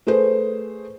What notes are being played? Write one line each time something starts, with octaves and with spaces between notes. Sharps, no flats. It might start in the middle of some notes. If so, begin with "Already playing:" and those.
A3 G#4 B4 C5